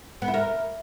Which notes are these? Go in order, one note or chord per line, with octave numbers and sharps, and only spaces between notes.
B3
E4
A#4